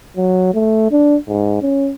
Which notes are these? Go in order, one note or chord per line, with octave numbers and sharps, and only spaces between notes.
F#3
A3
D4
G#2
C#4